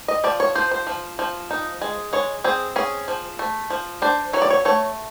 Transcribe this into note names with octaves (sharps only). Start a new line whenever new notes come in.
D#5
F3 D5
C#5
F3 C5
C5
F3
F3
D#4
G#3
G#3 C#5
C4 G#4
C#4 G#4
F3
A3
F3
D4 C5
F#3 C#5
D5
C#5
A3 C#5